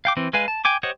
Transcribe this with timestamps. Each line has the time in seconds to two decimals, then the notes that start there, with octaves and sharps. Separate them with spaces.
0.05 F5 G5 D6
0.17 E3 C4
0.33 G#3 B4 F5 G#5
0.48 A5
0.65 G5 G#5 D6
0.83 G4 C5 C#5 D#5 F#5